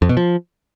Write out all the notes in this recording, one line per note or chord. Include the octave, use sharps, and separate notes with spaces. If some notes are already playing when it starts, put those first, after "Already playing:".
F2
B2
F3